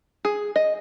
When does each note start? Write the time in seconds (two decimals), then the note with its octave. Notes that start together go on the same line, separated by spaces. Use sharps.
0.25 G#4
0.56 D#5